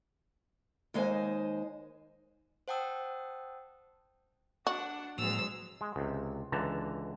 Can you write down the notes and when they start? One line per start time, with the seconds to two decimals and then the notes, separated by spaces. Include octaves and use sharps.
0.94 D#2 G#3 D#4 C5 C#5 G#5
2.68 C5 F#5 G5 A5 D#6 E6
4.67 D4 F#4 F#5
5.18 A2 F3 F#3 G#3 A#3 E6
5.81 G#3
5.96 C#2 C3
6.52 C#2 D3 E3 A5 A#5